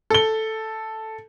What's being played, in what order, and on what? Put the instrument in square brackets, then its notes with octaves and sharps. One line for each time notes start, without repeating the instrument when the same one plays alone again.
[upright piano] A4 G7